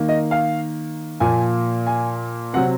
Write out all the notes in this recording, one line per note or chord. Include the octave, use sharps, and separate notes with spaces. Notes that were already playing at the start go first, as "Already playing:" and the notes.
Already playing: D#3 A#3
D#5
F5
A#2 F3 A#3 G#5
G#5
C3 F#3 C4 F#5